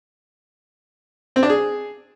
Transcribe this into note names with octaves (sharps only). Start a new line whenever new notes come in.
C4
D4
G#4